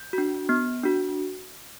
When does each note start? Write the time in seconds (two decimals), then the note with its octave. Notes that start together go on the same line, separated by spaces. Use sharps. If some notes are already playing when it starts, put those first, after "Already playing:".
Already playing: G6
0.13 D4 F#4
0.49 B3
0.83 D4 F#4